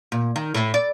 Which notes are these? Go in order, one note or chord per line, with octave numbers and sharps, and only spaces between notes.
A#2
D#3
A2
D5